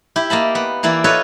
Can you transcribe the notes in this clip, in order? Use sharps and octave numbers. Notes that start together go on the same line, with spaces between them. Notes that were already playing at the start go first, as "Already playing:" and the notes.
E4 G4
A#3 D#5 A5 B5
B3
E3 A#3 E4 D5
F4 A4 B4 C#5 D#5